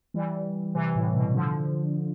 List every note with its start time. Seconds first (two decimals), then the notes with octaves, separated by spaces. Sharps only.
0.14 E3 G3
0.75 C3 E3
0.95 A2
1.15 B2
1.35 D3 F3